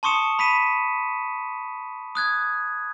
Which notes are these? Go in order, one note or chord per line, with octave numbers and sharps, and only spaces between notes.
A5 C6 C#6 D#6 C#7 E7
B5 B6 D#7 E7
D#6 F#6 G#6